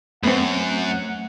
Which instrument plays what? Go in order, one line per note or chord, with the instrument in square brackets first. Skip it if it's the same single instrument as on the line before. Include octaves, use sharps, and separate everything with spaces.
[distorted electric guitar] F#2 [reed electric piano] A3 [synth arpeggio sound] B3 C4 [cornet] F#5